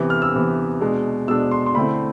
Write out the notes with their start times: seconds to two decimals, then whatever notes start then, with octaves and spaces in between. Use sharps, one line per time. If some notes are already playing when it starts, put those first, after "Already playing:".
Already playing: C3 E3 B3
0.10 F6
0.22 E6
0.34 C3 E3 B3
0.81 B2 G#3 D4
1.28 B2 G#3 D4 E6
1.51 C6
1.66 C6
1.75 D3 A3 C4 E4 B5